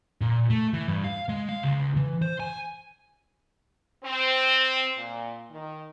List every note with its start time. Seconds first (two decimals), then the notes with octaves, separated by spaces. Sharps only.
0.21 A#2
0.50 A3
0.73 E3
0.88 G2
1.04 F5
1.29 G#3
1.49 F5
1.63 C#2
1.96 E3
2.22 C5
2.40 G#5
4.04 C4
4.98 A#2
5.51 D#3